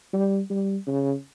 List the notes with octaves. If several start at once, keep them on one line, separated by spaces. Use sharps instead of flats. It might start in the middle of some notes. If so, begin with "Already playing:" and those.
G3
G3
C#3